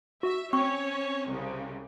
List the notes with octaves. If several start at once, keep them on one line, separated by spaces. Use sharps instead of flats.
F#4 E5
C4 C#4 C#5 C#6
C2 C#3